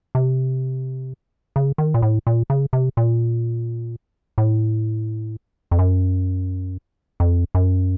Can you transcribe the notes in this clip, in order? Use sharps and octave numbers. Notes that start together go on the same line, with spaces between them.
C3
C#3
D#3
A#2
A2
A#2
C#3
C3
A#2
A2
F2
F#2
F2
F#2